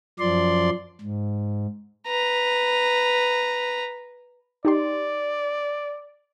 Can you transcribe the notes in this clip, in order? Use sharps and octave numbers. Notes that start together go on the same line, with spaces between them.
F#2 F3 D5 C6
G#2
B4 A#5
D#4 G4 D5 C6